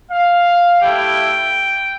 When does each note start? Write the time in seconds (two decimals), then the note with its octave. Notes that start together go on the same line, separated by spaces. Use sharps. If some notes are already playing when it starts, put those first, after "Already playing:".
0.11 F5
0.81 A3 E4 G4 G5